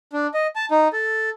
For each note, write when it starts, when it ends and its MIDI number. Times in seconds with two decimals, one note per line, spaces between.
0.13 0.27 62
0.34 0.47 75
0.56 0.65 81
0.71 0.88 63
0.93 1.30 69